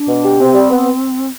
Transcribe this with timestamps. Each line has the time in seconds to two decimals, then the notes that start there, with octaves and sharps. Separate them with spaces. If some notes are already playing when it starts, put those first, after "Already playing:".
Already playing: D4
0.08 B2
0.24 G4
0.39 C3 C4
0.54 G3
0.70 B3